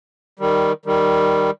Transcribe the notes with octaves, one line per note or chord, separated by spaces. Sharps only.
D#3 G3
D#3 G3